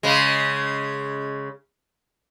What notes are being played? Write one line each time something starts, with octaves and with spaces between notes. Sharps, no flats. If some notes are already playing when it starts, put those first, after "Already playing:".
C#3 G#3